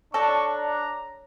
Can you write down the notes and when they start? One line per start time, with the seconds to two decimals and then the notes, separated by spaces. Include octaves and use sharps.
0.14 D4 A4 C#5 C#6 A#6
0.58 A#5